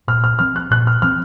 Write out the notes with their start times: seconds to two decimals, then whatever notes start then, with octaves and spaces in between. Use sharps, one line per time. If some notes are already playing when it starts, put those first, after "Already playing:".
0.08 A#2 F6
0.24 F6
0.39 F3 C4 F6
0.56 F#6
0.70 A#2 F#6
0.87 F6
1.02 F3 C4 F6